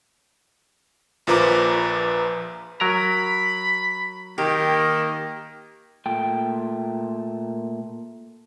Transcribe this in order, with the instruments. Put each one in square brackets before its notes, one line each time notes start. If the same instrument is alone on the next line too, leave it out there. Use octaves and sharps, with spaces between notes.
[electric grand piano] A#1 A#2 F3 B4 A#5 D6
[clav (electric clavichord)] F#3 A#4 A#5 [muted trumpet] B5
[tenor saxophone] D#3 [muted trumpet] A#3 [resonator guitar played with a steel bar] G4
[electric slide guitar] A#2 A3 G5